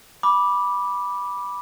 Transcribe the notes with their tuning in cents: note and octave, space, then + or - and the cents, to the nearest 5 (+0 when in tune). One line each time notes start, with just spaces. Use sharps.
B5 -10 D6 +0